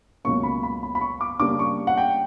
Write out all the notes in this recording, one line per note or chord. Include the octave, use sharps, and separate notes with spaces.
C#2 B2 F#3 A#3 C#4 C#6
B5
B5
B5
B5
C#6
D6
C#3 G3 A#3 D4 D6
C#6
F#5
G5